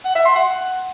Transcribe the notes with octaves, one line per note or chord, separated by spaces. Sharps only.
F#5
E5
C6
F#5